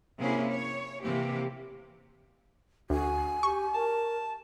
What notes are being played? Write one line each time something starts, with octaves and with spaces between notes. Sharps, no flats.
C3 A#3 C4 C#4 E4 G#4
C#5
C3 E3 A#3 C4 G4
D2 F#4 G#5
G4 C#6
A#4 A5